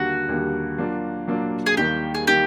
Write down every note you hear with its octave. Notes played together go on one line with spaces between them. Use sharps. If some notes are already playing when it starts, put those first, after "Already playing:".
Already playing: D#2 D3 G3 A#3 F#4
D#2 D3 G3 A#3
F#3 A#3 D4 F4
F#3 A#3 D4 F4
G#4
D#2 D#3 G3 A#3 G4
G#4
D#3 G3 A#3 G4